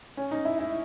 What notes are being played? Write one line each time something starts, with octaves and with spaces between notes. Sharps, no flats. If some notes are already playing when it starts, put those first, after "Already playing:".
C#4
D#4
E4
E4